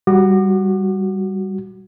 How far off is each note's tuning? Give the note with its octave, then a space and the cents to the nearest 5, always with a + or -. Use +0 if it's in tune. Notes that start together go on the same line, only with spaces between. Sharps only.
G3 +0 F#4 +0 D6 +40